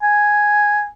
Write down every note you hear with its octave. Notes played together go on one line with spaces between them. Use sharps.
G#5